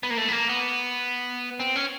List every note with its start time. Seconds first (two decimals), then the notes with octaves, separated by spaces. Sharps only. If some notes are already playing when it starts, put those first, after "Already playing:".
0.03 B3
0.10 A#3
0.17 A3
0.28 B3
0.32 A#3
0.49 B3
1.60 C4
1.76 C#4